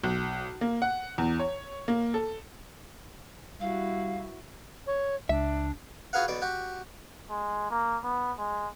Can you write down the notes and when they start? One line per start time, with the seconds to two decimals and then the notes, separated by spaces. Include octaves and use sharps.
0.03 B1
0.61 A#3
0.82 F#5
1.18 E2
1.39 C#5
1.88 A#3
2.14 A4
3.61 G3 E4 F#4 F5
4.87 C#5
5.29 C#2 D4 E5
6.13 F4 F#4 G#4 B4 F5 F#5
6.28 B1 B2 D5
6.42 F#4 G4
7.30 G#3
7.70 A#3
8.03 B3
8.38 G#3